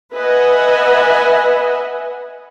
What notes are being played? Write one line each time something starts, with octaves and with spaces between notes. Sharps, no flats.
B4 D#5 E5 F#5 G#5